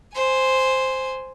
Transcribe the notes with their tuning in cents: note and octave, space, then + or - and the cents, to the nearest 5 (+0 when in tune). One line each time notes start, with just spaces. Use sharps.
C5 +0 G#5 +0